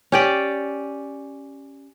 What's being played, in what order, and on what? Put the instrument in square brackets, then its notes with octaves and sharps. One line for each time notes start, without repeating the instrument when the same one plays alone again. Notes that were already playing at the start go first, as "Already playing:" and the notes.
[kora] C#4 G4 D5